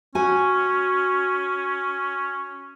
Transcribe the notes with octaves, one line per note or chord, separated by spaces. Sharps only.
C#4 F#4 G#5